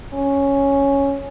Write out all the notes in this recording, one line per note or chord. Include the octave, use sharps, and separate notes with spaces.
C#4